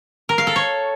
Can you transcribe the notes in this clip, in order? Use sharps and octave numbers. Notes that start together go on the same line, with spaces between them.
A#4
F5
A4
C#5